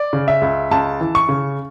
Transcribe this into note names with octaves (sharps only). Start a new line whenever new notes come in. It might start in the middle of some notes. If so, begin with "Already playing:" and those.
Already playing: D5
C#3
E5
C#2
C#2 A5
E3
C#6
C#3